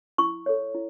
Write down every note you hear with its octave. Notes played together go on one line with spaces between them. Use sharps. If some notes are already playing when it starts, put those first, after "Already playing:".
E4 C#6
A4 C#5
E4